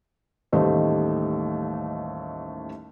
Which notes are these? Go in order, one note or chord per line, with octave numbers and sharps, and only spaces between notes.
A1 D#2 G3 A3 C5 D#5